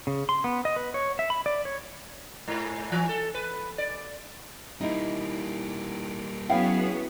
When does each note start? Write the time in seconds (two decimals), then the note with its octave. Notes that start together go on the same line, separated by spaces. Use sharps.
0.07 C#3
0.29 C6
0.44 B3
0.65 D#5
0.76 B4
0.94 C#5
1.19 E5
1.30 B5
1.46 D5
1.65 C#5
2.48 G#2
2.92 E3
3.09 A4
3.34 B4
3.78 D5
4.81 G3 A#3 D#4 E4
6.49 F#3 B3 C#4 E4 G#4 F5 G5